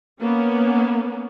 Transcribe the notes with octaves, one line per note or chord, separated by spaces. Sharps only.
A#3 B3 C#4